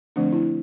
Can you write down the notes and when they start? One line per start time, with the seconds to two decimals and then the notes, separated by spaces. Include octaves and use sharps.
0.16 D3 F3 A3 C4 D4
0.33 E4